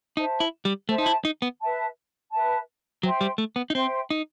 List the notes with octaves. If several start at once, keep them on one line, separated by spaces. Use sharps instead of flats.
D#4 C5 E5 A5
E4
G3
A3 C5 E5 A5
D#4
E4
D#4
B3
B4 E5 A5
B4 E5 A5
F#3 C5 E5 G5 C6
G3
A3
B3
D#4
C4 C5 E5 G5 C6
D#4